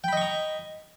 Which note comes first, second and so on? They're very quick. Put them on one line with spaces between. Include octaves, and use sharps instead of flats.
G5 B5 D#5 C#6 A#5